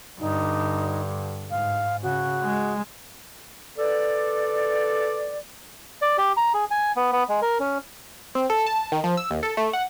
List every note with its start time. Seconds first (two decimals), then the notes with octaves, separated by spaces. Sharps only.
0.20 G2 D3 D#4
1.50 G#2 F5
2.03 C#3 F#4
2.43 G#3
3.78 A4 B4 D5
6.02 D5
6.18 G4
6.37 A#5
6.54 G#4
6.71 G#5
6.96 B3
7.12 B3
7.29 G#3
7.42 A#4
7.60 C#4
8.35 C4
8.50 A4
8.67 A5
8.92 D#3
9.04 F3
9.17 E6
9.30 D#2
9.43 A4
9.57 A3
9.73 F#5